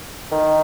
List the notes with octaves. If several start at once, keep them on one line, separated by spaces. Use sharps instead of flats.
D#3